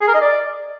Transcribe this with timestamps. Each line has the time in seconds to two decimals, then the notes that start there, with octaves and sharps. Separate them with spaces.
0.01 G#4
0.08 A#4
0.14 D#5
0.21 D5